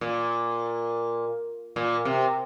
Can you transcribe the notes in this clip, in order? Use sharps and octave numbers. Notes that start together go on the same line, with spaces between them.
A#2
A#2
C3